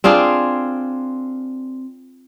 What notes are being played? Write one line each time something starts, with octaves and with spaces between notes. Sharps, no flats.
C4 D4 F4 G#4